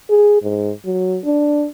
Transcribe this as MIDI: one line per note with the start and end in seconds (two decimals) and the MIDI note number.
0.10 0.38 68
0.42 0.72 44
0.85 1.19 54
1.25 1.67 62